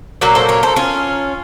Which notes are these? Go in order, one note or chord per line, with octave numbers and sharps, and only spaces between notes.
A#2 F#3 A#3 F#4 A#4
A4 C5
A#4 C#5
A4 C5
C#4 F4